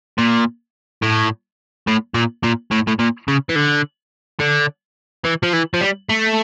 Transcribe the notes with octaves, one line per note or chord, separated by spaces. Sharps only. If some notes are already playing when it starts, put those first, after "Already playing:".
A#2
A2
A2
A#2
A#2
A2
A2
A#2
C#3
E3
D3
D3
E3
F3
E3
F3
G3
A3